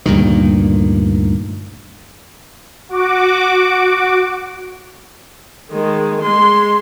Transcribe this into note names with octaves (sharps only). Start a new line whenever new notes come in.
D2 G2 A#2 D#3
F#4 D6
D#3 G#3
G#3 C6